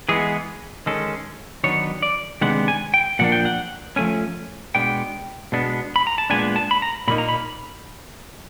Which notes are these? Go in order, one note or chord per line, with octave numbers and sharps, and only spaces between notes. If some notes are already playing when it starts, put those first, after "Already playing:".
E3 G#3 B3 G#4
D#3 G#3 C#4 A4
D#3 F#3 B3 D4 C#5
D5
C3 D#3 G#3 B3 D4 F#5
G#5
G5
A#2 F3 A#3 D4 F#5
G5
F#5
F3 A3 C#4 G#5
B2 G#3 B3 D4 G5
B2 G#3 B3 D4
B5
A#5
A5
A#2 F3 G#3 B3 D4 G#5
A5
B5
A#5
A#2 F#3 A#3 D#4 B5
A#5
B5